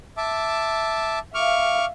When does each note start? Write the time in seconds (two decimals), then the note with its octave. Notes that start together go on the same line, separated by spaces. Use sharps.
0.17 E5 A5 D6
1.35 E5 F5 C#6 D6 F6